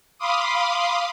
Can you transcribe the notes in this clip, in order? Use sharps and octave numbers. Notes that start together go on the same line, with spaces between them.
F5 B5 C6 D6 D#6